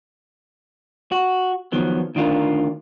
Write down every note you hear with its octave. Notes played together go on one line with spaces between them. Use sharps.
F#4
D#3 F3 F#3 B3
D2 D#3 D4 F4 A#4